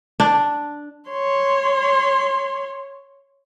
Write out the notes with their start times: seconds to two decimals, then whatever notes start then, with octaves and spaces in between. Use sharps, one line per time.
0.20 D4
1.10 C#5 C6